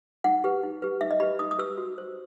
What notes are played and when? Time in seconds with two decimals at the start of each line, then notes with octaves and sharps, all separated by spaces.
0.24 D#4 F#5
0.44 G4 B4
0.63 D#4
0.82 G4 B4
1.01 D#4 E5
1.11 D#5
1.20 G4 B4 B5
1.39 D#4 D#6
1.51 D#6
1.58 G4 B4 E6
1.78 F#4
1.98 C5